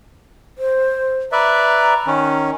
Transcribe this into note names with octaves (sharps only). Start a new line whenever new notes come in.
C5
B4 D5 E5 A#5
D#3 C#4